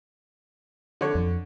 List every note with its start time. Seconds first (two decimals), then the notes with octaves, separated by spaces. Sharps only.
1.01 D3 C#5
1.15 F2